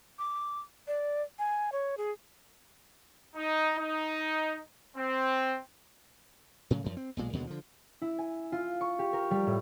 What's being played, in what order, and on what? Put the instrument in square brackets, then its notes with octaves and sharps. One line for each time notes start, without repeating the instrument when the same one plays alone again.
[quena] D6
D5
G#5
C#5
G#4
[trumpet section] D#4
D#4
C4
[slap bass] A2 C#3 F#3
F#2 F3
C4
B1 A#2 G#3
D#2 B2 D3 G#3
D3 F3
[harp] E4
G#5
F4
C#6
G4
A#4
G3
A2